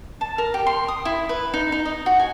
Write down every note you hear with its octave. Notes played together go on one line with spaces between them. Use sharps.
A5
A#4
G4
C6
D#6
E4
B4
D#4
D#4
D#5
F#4
G#5